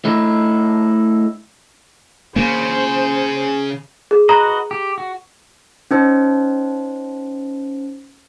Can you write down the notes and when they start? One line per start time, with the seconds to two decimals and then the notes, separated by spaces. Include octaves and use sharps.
0.05 A3 D#4 E4
2.36 C#3 A#3 C5
4.11 G#4
4.29 F#4 B4 D#5 A#5
4.71 G4
4.98 F#4
5.91 C#4 D#4 C5